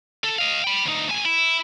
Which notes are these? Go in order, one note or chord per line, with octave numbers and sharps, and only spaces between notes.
D3 A4
D#5 F5
G5 B5
D2 D#4
A2 G#5
E4